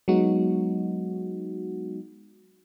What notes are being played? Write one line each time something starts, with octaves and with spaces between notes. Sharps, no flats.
F#3 G#3 B3 D#4 F#4